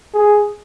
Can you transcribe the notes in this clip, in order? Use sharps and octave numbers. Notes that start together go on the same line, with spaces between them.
G#4